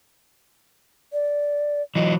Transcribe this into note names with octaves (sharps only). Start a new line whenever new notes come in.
D5
E3 F#3 D#5